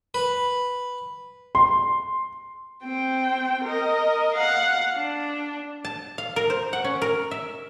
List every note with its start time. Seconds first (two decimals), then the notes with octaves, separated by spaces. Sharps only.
0.14 B4
1.55 C6
2.83 C4 G5
3.64 A#4 D#5
4.35 F5 F#5
4.96 D4
5.85 A5
6.18 F5
6.36 A#4
6.50 C5
6.73 F#5
6.84 C#4
7.02 A#4
7.31 E5